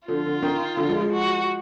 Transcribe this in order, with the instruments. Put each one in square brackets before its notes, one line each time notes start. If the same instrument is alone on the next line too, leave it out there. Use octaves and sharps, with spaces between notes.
[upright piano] D3 F3 [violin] F4
[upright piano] D3
D#3
D3 F3
F3 G#3
F3 G#3
[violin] F#4